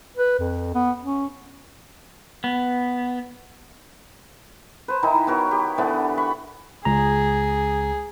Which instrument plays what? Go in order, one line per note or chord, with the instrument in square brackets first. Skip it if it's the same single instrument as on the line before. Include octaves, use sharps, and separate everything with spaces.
[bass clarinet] B4
F2
B3
C#4
[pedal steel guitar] B3
[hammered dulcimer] B4 C5
D#3 E3 D#4 E4
B3 F#4 A#4 C#5
G4
D3 E3 B3 D4
B5 C#6
[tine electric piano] C#2 A#5 [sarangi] G#4